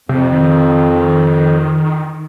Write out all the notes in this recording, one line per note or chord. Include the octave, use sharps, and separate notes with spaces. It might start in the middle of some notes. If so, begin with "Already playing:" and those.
F2 C3
D#3